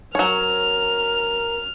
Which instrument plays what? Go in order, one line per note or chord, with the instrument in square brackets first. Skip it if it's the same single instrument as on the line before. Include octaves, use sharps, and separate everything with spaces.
[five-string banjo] F#3 C#5 [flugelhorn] A#4 [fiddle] F6